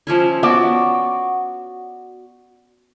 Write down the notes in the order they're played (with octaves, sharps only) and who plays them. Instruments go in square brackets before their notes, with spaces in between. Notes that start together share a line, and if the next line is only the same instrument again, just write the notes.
[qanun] F3 C#4 E4
[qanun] B3 A5 [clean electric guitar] F#4 D5